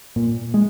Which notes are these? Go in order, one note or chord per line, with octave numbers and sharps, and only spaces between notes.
A#2
G#3